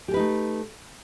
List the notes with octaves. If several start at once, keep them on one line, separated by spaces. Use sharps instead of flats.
A3 D#4 G4 G#4 B4